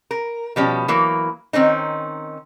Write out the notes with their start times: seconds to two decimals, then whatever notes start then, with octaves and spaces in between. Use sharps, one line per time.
0.11 A#4
0.56 B2 F3 G3 C#4
0.88 E3 F#3 A#3
1.53 D#3 C4 C#4 D#4